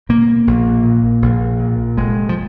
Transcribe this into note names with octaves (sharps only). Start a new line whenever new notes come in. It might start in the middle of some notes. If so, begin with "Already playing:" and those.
B2 A#3
A#1
A#2
A#1
A#2
F1 G#3
F3